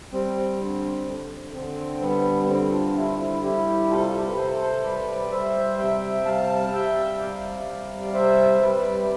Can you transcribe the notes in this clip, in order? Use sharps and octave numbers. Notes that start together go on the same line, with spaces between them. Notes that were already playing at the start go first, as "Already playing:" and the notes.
G3 C4
D3 C4
D3
D3 C4
G3 B3
B3
D3 C4
D4 F4
G3 C4 E4
C4 E4
G3 E4 G4
C3 F4 A4
F4
G4
A4
B4
C3 A4 C5
G3 B4 D5
G3 C5 E5
C3 E5 G5
G3 F5 A5
G3 E5 G5
C3 D5 F5
G3
C3 C5 E5
G3 B4 D5